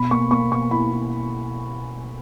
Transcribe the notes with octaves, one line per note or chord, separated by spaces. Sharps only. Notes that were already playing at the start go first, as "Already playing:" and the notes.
Already playing: B2 B5
A#3 C#6
A#3 C#6
B2 C#6
E4 B5
E4